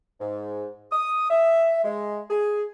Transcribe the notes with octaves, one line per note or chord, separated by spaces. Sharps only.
G#2
D#6
E5
G#3
G#4